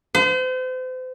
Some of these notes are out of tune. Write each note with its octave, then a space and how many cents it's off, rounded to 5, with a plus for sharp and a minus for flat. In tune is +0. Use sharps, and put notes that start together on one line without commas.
C5 -40